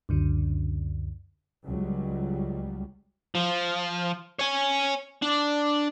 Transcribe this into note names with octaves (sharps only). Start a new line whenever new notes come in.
C#2 F#2 D3
C#2 F#3 G3
F3
C#5 G#5
D4